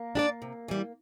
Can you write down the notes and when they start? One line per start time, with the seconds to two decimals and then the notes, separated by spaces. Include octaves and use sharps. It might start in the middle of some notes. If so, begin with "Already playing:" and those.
Already playing: A#3
0.15 D4 G4 D5
0.42 C3
0.68 E3 G3